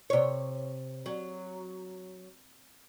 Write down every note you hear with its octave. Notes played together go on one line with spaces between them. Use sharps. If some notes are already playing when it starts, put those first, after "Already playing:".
C3 C#5
F#3